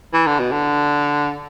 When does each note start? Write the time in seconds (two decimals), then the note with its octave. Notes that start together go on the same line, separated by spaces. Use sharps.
0.13 E3
0.27 D3
0.40 B2
0.52 D3